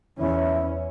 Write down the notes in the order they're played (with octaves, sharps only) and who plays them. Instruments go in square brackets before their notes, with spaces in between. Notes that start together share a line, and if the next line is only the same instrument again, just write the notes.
[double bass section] E2 C#4 [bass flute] E4